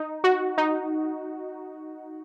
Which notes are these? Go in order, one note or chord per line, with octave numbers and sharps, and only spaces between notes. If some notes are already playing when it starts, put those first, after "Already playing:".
Already playing: D#4
F#4
D#4